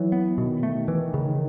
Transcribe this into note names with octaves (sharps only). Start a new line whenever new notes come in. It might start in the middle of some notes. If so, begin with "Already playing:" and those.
Already playing: E3 F#3
B3
B2 D#3
A3
E3
C#3